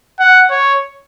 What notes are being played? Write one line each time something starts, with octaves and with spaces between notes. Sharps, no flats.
F#5
C#5